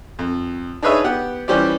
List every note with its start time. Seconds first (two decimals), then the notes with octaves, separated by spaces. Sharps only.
0.19 F2
0.83 D4 D#4 G#4 B4 C#5 E5
1.04 B3 G4 F#5
1.48 E3 G3 C#4 G4 C5 D5